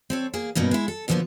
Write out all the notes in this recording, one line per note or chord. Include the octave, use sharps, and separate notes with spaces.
C4 A4 C#5
A#3 G#4
G2 B2 A#3 C#4 D#4
G#3 E4
A4
B2 D3 F3 G3 A#3 B3